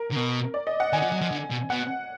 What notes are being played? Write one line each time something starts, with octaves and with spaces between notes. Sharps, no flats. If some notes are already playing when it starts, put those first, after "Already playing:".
Already playing: A#4
D3
B2
D5
D#5
F#5
D#3 G#5
F3
F#3
F3
D3
B2
B2 F#5